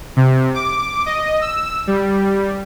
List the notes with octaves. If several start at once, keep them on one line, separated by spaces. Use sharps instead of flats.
C3
D6
D#5
E6
G3